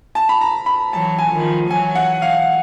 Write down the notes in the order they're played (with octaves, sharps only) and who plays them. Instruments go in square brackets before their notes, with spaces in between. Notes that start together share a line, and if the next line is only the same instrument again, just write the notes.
[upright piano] A5
B5
A#5
B5
[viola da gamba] E3 F#3 [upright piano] A5
[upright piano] G#5
[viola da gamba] D#3 F3
[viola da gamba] E3 F#3 [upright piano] G#5
[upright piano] F#5
F5